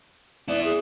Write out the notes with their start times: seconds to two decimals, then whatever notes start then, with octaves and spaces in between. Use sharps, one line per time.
0.48 B3 E4 D5
0.64 G#4